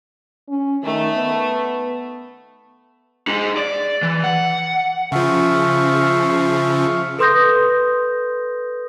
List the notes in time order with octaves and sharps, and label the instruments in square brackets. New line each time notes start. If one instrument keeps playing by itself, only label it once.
[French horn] C#4
[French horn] D#3 [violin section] A3
[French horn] B3
[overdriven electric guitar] D#4 G#4
D5
E3
F#5
[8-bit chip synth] C#3 F3 [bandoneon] E5 F5 C#6
[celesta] A4 B4 C6 D#6 G6 A#6